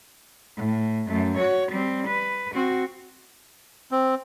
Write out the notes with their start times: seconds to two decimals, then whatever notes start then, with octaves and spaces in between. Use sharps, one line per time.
0.57 A2
1.07 F#2 A3
1.37 F#4 C#5
1.72 G3 C4
2.08 B4
2.54 C4 F#4
3.91 C4